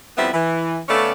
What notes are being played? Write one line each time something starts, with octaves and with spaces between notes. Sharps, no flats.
F2 G3 B3 C4 E4 E5
E3
C#3 A3 B3 C#4 A4 D5